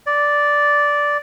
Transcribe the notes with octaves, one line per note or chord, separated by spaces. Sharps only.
D5